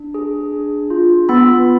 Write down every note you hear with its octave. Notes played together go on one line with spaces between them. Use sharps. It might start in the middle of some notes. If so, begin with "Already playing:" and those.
Already playing: D4
G#4
D4
F4
B3 B5